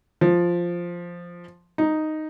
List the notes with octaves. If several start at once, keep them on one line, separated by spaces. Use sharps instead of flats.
F3
D#4